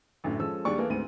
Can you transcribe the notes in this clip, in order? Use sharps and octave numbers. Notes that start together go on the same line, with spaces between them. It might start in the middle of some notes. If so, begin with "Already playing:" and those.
A1 F#2 A2 D3
F3 G#3 C#4 A4 E6
D#2 G3 G#3 D4 D5 C#6
E3 A#3 B3 G#4 A4
D2 G#2 B3 C4 D#7